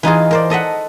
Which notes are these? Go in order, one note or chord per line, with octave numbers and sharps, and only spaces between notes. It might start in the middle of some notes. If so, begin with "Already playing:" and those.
E3 D#4 F4 G#4
A#4 C5 D5
A4 D#5 E5 F#5